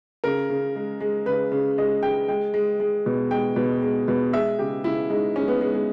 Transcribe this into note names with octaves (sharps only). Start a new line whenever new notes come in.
C#3 A#4
C#3
G#3
G#3
C#3 B4
C#3
G#3 D#5
G#3 G5
G#3 G5
G#3
G#3
B2
G#3 G5
B2
G#3
B2
G#3 E5
C#3 G4
C#3 E4
G#3 D#4
G#3 C#4
B3
G#3
G#3